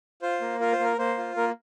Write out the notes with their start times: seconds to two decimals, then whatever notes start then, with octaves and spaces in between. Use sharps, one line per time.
0.22 F4 C5
0.41 A#3
0.60 F4 A#4
0.72 C5
0.80 A#3
0.85 A#4
0.98 A#3 C5
1.17 F4
1.37 A#3 A#4